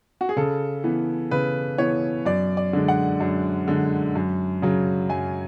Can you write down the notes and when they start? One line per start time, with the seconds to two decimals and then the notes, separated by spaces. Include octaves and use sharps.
0.21 F#4
0.29 G#4
0.36 C#3 A4
0.84 E3 B3
1.31 C#3 B4
1.78 E3 B3 C#5
2.25 F#2 D5
2.57 D5
2.73 D3 G#3
2.88 F#5
3.20 F#2
3.68 D3 G#3
4.15 F#2
4.62 C#3 F#3
5.09 F#2 G#5